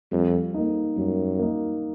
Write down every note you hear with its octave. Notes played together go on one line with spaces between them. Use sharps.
F2 G3
A#3 D#4
F#2 G3
A#3 D#4